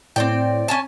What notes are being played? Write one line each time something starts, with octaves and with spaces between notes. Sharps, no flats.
A2 C4 D5 G5
C#4 G#5 A5